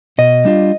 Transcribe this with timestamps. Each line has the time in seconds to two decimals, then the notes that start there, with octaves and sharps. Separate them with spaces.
0.18 B2 D#5
0.45 G3 D4 F4